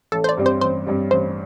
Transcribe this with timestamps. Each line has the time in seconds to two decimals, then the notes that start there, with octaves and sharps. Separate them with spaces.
0.12 A1 A4
0.24 C5
0.29 D5
0.37 G2 G3 C4 G4
0.46 C5
0.61 A1 C5
0.87 G2 G3 C4 G4
1.11 A1 C5